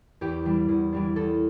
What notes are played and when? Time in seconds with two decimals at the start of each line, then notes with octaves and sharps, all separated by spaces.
0.21 E2 G4
0.45 E3 G3 D4
0.69 E2
0.92 E3 G3 D4
1.16 E2 A4